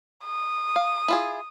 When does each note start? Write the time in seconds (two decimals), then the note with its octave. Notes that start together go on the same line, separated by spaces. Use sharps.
0.25 D#6
0.76 F5
1.08 E4 F4 G#4